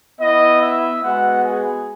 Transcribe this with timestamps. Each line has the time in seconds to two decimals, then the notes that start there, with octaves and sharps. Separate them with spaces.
0.21 B3 E4 D#5
0.62 E5
1.04 G#3 B3 F#4 F#5
1.44 G#4